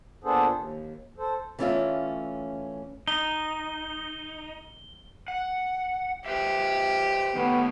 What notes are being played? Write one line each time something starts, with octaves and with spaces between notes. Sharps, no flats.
A#2 B3 D4 G#4 A4 C5
D#2
A4 C5
E3 A3 C#4 F4 D5 E5
D#4 G7
F#5
G4 B4 C5 E5
D#3 A3 B3 C#5